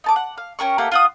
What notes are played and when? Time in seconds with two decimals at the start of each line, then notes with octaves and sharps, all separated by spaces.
0.04 D#4 A5 D6
0.16 F#5
0.38 F5
0.59 C#4 G4 A#4 C#6
0.78 A3 A#3 G4 F#5
0.92 F4 F#5 D#6